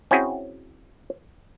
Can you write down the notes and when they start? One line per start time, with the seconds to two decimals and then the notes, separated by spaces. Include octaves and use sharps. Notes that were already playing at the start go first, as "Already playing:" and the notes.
0.11 C4 C#4 E4 F#4 G#4